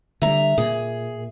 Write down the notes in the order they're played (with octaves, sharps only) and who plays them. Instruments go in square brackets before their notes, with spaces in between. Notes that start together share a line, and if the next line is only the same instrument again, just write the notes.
[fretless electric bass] D3 G3 [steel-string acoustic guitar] E5 A#5
[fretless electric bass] A#2 [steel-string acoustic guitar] G#4